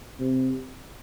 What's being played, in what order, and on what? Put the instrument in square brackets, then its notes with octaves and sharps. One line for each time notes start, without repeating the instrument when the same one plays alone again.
[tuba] C3